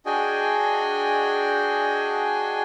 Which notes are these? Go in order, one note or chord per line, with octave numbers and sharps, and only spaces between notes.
D4 F#4 G#4 D#5 G5 G#5